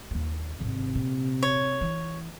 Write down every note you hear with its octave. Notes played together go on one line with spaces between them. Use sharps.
D#2 A#3
G#1 C3 D#3
A#2
C#5
E3